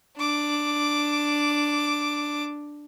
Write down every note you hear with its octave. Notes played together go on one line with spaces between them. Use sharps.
D4 D6